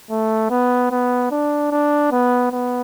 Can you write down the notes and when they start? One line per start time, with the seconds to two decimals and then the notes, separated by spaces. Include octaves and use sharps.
0.11 A3
0.50 B3
0.91 B3
1.31 D4
1.71 D4
2.11 B3
2.52 B3